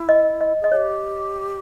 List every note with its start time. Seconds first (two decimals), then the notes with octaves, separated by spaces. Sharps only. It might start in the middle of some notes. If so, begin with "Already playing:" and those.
Already playing: E4
0.09 D#5
0.41 D#5
0.61 G#4 D#5
0.72 G#4 C#5
0.76 G4